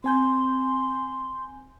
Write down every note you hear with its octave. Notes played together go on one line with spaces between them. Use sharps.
C4 G#5 C6 G6